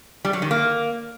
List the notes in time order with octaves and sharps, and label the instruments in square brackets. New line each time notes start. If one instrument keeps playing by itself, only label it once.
[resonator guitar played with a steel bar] G3
F#3
D#3
A#3